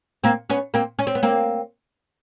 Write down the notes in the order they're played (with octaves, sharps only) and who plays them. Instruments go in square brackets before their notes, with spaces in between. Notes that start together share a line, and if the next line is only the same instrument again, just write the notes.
[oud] A#3 C4
B3 C#4
A#3 C4
C#4
C4
B3
A#3 C4